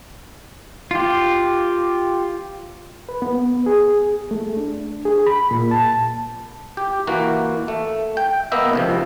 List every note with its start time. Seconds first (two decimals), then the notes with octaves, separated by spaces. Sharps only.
0.91 F4 G4
3.09 B4
3.22 B3
3.66 G#4
4.31 A3
4.57 D4
5.05 G#4
5.27 B5
5.51 A#2
5.71 A5
6.77 G4
7.07 E3 A#3 F#4
7.68 A3
8.17 G5
8.52 A#3 B3 D#5 E5
8.73 C#2 C3 F3